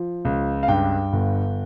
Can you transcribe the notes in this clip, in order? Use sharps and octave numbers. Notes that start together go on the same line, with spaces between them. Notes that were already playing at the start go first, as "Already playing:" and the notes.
Already playing: F3
C#2
F5
G2 G5
G1